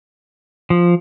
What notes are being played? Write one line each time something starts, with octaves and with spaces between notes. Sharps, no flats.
F3